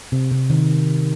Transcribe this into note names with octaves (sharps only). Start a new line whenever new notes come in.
C3
C3
D#3